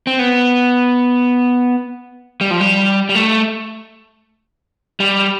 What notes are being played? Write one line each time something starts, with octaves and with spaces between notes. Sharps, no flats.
C4
B3
G3
F3
G3
G3
A3
G3